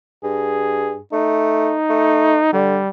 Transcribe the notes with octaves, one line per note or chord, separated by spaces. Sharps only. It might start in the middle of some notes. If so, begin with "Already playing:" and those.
G2 G#4
A3 D#4
A3
D3 G3